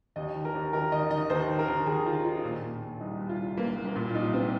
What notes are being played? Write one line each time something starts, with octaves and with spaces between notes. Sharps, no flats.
D#2 D#5
D#3
A#4
D#2
D#3 A#4
D#3 D#5
D#3 D#5
D#2 C5
D#3
A#4
D#2
D#2 G#4
D#3 F4
D#3 F4
A#2
A#2
A#2
C2 D#4
C2
F4
C2
C2 A#3
C2
A#3
A#2
F4
C2 D#4
C2 C4